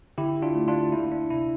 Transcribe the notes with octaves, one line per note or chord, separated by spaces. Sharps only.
D3 E4 G4
D4 F4
A3
D4 F4
A#3 E4
D4
C3 E4